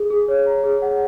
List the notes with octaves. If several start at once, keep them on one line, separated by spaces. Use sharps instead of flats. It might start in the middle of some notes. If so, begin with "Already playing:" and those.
Already playing: G#4
G#4
C#5
A#5
G#4
F#5